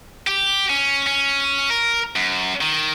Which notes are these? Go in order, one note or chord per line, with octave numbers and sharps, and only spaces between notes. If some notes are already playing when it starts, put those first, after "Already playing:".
G4
C#4
C#4
A#4
F#2
D#3